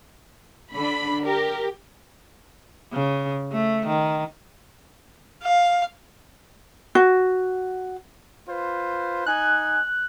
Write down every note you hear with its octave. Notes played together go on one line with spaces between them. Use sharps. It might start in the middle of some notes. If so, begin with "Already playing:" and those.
D3 D4 B5
G4 A#4
C#3
A3
D#3
F5
F#4
F4 B4 C5
D#4 G#5 F#6